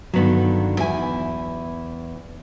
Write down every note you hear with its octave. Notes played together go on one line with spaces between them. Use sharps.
G2 D3 D#3 F#3 B3
E2 E4 G#5